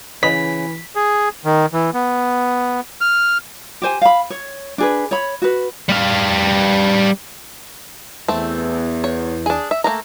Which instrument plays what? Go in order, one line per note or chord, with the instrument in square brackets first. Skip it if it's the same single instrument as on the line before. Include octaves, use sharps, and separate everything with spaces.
[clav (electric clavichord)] C#3 [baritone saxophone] E3 [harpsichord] B4 D#5 [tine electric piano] B6
[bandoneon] G#4
D#3
E3
B3
F6
[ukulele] G4 C5 G#5
F5 B5
C#5
D4 G#4 B4
C#5 B5
F#4 B4
[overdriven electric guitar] G3 F5
[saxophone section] E2 [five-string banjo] A3 C4
[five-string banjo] C#5
D4 G#4
E5
A3 A#3 A#5